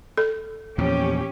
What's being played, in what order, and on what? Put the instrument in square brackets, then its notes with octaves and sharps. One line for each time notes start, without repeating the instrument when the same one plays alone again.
[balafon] A4
[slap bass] E2 A#2 F3 [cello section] C#4 G4